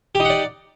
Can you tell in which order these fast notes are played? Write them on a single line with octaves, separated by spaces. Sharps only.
G4 D#4 F#5 D5